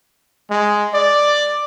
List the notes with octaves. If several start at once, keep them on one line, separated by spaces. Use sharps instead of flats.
G#3
D5